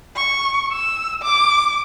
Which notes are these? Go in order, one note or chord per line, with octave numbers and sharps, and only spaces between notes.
C#6
E6
D6